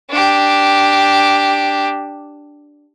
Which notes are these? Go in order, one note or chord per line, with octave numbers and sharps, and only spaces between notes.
D4 G4